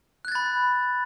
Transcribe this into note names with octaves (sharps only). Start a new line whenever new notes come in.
B5 F#6 G#6 A6